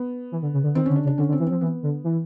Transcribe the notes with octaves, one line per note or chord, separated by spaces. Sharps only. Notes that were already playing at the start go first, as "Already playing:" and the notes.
Already playing: B3
E3
D3
C#3
D3
D#3 C4
D3 C#4
D4
C#3
D4
D3 C#4
D3
C4
E3
F3 C4
E3 B3
D3
E3